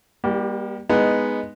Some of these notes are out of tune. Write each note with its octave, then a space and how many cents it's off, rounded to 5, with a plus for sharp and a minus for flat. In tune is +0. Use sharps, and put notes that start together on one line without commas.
G3 +30 A#3 +40 G4 -20
G#3 +0 B3 +0 D#4 -5